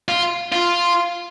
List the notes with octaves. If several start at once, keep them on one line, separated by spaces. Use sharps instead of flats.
F4
F4